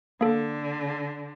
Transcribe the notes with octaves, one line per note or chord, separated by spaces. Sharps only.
D3 A#3 A4